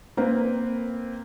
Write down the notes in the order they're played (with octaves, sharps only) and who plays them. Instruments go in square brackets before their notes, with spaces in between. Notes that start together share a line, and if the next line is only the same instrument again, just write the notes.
[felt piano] A#3 C4 B4